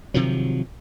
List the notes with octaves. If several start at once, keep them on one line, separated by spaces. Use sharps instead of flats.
C3 D#3 F3 F#3